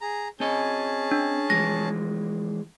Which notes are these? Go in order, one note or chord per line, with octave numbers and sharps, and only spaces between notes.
G#4 A#5
C4 C#4 G#4 D#5 A5
D4
E3 F3 G#3 A#6